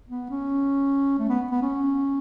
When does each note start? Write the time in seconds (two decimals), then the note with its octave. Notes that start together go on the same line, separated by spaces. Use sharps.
0.09 B3
0.30 C#4
1.19 A3
1.29 B3
1.51 B3
1.62 C#4